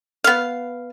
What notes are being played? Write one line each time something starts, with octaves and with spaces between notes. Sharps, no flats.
B3 F5